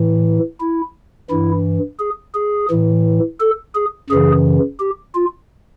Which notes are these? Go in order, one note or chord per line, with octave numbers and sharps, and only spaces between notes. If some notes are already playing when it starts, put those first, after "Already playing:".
Already playing: A2 E3
E4
G2 E3 E4
G#4
G#4
A2 E3
A4
G#4
F#2 C#3 E3 G#4
G4
F4